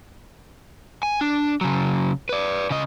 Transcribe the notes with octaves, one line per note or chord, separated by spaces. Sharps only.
G#5
D4
C#3 F#3
B4 D5
C#3 D#5